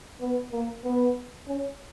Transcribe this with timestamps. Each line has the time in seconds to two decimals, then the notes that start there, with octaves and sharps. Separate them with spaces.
0.21 B3
0.52 A#3
0.84 B3
1.47 C#4